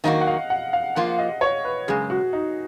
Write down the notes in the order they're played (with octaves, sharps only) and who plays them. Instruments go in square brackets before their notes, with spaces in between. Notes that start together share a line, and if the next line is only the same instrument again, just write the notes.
[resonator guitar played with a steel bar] D#3 F#3 A#3 D#4 F#4 [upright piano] D#5
[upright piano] F#5
F5
F#5
F5
[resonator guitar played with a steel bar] F3 A#3 F4 [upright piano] F#5
[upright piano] D#5
C#5
B4
[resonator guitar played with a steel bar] F#2 C#3 G#3 [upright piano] G#4
[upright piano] F#4
D#4